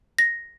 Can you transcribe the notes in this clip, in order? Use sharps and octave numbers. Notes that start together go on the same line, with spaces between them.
A#6